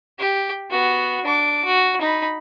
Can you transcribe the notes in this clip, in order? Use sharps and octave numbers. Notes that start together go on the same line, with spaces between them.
G4
B3 F#4
D4 D6
F#4
D#4 B5